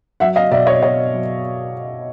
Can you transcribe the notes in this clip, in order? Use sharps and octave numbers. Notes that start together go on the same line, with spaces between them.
F#3 E5 F#5
D#5 F5
B2 D5 E5
C#5 D#5
B2 C#5 D#5
F#3